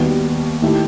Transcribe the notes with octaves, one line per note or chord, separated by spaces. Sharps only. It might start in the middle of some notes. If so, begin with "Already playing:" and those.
Already playing: D#2 D#3 G3 B3 F#4
D#3 A3 E4 G4